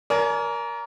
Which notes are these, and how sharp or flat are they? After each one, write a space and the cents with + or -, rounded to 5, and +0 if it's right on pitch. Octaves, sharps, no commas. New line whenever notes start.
A#4 +10 D5 -40 G#5 +35